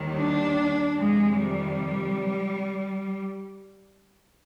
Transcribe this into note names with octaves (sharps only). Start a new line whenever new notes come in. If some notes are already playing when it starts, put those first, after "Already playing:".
Already playing: D#2 D#3 G3
D4
F2 C3 D#3 G#3
G3